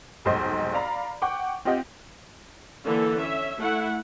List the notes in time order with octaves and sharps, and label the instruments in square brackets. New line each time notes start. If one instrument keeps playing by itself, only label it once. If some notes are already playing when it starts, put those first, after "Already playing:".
[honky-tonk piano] F1 B1 G#2 C5 D#5 C6
D5 F5 A#5 B5
F#5 G5 C#6 D6
C4 F4 G4 D#5 F#5 G5
[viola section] D3 E3 A#3 A4
C#4 E5
A3 E4 F#5